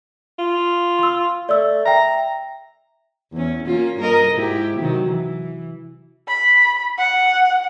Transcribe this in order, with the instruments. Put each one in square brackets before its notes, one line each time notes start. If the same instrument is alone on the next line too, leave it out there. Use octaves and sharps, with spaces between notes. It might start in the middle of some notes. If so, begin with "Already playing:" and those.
[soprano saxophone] F4
[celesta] C6 E6
[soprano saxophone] A3 [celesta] D5 E6
[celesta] E5 G5 [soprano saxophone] A#5
[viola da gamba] E2 C#4
A#3 C#4 F4
G2 A#4 D#5
G#2 E4 G4
C3 D#3 F#3
E3
[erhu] B5
F#5